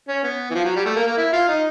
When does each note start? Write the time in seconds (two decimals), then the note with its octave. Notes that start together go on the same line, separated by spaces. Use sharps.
0.08 C#4
0.23 B3
0.50 E3
0.54 F3
0.65 F#3
0.76 G3
0.86 A3
0.96 A#3
1.07 A#3
1.17 E4
1.33 F4
1.48 D#4